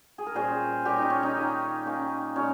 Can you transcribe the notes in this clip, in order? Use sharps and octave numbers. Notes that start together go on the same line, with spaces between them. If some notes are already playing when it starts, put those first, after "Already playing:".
G#4
A#4
A#2 G3 C#4 G#4 C5
A#2 G3 C#4 G4 A#4
D#4
C#4
D#4
D#3 A#3 C#4
D#3 A#3 C#4
A#2 G#3 C#4